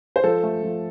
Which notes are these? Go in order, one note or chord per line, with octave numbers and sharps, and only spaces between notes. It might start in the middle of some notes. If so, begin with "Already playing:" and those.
C5
F3 A4
A3
F3